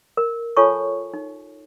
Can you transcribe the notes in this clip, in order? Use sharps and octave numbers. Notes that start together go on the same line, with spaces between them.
A#4
F4 A4 C#5 G#5 A5 C#6
D#4